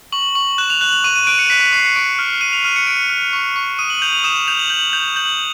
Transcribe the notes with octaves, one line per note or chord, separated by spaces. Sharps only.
C#6 F#7
C#6 F#7
F#6 E7
F7
F#6 F#7
F7
C#6 D#7
D#7
F#6 D7
C#7
F#6 B6
B6
C#6 C7
C#7
C#6 D7
F6
F6 D#7
F7
F6 D#7
C#7
F6 D7
F6
C#6
C#6
D#6 D#7
F#7
G6 F7
F7
D#6 E7
E7
G6 F7
F#7
G6 F#7
G6 F7
G6 F#7